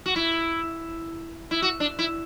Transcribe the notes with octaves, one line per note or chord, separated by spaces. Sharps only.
F#4
E4
E4
F#4
D4
E4